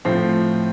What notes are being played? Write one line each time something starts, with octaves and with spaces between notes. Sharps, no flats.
A2 F3 C4